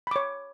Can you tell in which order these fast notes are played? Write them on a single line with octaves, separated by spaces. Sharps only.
B5 D6 C#5